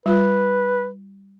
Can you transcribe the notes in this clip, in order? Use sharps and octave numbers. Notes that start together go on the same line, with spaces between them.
G3 F4 B4